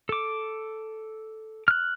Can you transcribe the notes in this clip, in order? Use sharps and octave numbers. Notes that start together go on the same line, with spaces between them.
A4 D6
F6 F#6